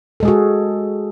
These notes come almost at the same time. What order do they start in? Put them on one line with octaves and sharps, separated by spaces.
A4 G#3 G#4 F#4